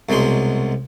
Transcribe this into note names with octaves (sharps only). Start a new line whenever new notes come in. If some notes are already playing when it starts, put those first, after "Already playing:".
C2 B2 F#3 G#3 C6